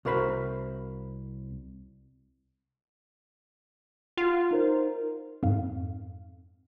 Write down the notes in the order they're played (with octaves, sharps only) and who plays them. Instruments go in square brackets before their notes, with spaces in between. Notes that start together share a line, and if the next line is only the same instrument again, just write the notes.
[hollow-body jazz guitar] C2 F#4 A#4 C5 B5
[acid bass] F4 [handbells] F#5
[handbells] D#4 A#4 C5
[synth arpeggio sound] F2 G#2 F5